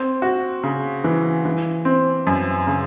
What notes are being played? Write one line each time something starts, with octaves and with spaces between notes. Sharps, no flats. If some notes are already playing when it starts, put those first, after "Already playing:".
Already playing: C4
F#4
C#3
E3
E3
C4
F#2
C#3